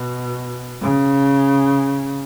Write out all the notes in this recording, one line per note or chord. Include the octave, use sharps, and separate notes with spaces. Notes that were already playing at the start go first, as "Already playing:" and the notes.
Already playing: B2
C#3